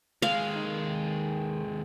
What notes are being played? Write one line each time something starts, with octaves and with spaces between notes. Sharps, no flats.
D#2 G#3 F5
D#3